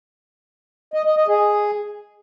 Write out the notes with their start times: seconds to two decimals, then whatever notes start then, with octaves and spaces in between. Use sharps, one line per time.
0.94 D#5
1.05 D#5
1.17 D#5
1.28 G#4